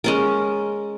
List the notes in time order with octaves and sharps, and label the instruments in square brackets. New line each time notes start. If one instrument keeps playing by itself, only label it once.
[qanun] G#3 C#4 A#4